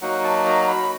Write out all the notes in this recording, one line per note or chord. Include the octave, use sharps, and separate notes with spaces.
F#3 A#3 D#4 F#4 F#5
A5
A#5
B5